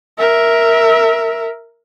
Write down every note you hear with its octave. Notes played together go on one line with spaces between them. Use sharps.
A#4 E5